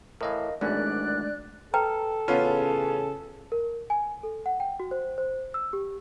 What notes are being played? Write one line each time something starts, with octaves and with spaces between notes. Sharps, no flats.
A2 E3 A#4 D#5 F5
G#1 F#2 E3 G#3 A3 D4 D5 F#6
A4 B4 G5 A#5
A1 C#3 B3 C#4 F4 G#4
A#4
G#5
A4
F#5
G5
F#4
C5
C5
E6
G4